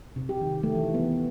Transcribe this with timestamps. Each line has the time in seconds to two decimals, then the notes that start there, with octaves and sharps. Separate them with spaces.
0.16 C3
0.29 G4
0.41 D#3
0.63 A3
0.75 E3
0.94 B3